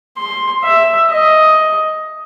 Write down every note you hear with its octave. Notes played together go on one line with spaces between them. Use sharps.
C6
E5
D#5